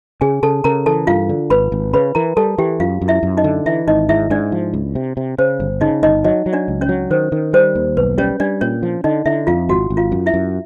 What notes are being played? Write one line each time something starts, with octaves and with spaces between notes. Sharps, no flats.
C#3 G#4 G#5
C#3 A4 A5
C#3 A#4 A#5
E3 A4 A5
G2 F4 F5
D3
G#1 B4 B5
G#1
C#3 B4 B5
E3 A#4 A#5
G3 A4 A5
E3 G4 G5
F#2 F4 F5
F#2
E4 E5
F#2
D#4 D#5
D3
E3 E4 E5
G#1 D#4 D#5
G#2 E4 E5
G#2 D4 D5
F3
C#2
C3
C3
C#3 C5
G1
C#3 D#4 D#5
G1 D#4 D#5
F#3 D#4 D#5
F#3
D4 D5
C#2
C#4 C#5
F#3
D#3 C5
D#3
G3 C5
D#2
B1 B4
G3 C#4 C#5
G3 D4 D5
A#2 C#4 C#5
F3
D3 D#4 D#5
D3 E4 E5
F2 F4 F5
G#1 F#4 F#5
G#1
F4 F5
F#2
E4 E5
F#2